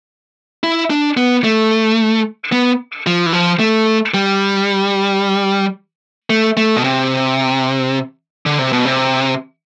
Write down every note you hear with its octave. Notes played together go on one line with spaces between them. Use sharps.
E4
D4
B3
A3
B3
F3
E3
F3
A3
G3
A3
A3
B2
C3
D3
C3
B2
C3